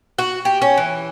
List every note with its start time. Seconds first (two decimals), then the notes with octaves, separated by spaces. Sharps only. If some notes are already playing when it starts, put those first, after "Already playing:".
0.18 F#4
0.45 G4
0.62 C#4
0.77 E3